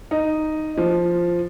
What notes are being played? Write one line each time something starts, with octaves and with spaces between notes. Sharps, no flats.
D#4
F3